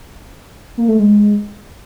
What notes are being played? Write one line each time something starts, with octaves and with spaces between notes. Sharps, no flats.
A#3
A3
G#3